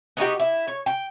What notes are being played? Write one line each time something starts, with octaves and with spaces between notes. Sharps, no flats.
B3 D#4 F#4 G4
E4
C#5
G5